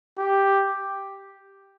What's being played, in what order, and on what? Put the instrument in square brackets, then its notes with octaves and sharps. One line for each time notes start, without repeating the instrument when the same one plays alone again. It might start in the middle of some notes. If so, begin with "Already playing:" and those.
[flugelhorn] G4